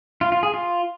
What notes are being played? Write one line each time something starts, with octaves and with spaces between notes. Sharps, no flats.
F4
F4
G#4
F4